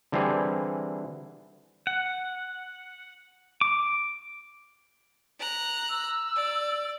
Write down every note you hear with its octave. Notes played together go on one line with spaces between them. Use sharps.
D3 E3 G3 C4 G#4
F#5
D6
A#5 F#6
E6
D5